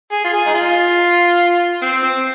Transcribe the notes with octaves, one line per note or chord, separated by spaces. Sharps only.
G#4
F4
G#4
D#4
F4
C4
C4